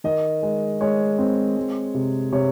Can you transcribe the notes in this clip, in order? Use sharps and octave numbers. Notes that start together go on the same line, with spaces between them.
D#3 D#5
G#3
G#3 C#5
C4
G#3
C3
C3 C#5